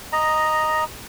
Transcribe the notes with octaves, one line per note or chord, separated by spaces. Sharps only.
D#5 A#5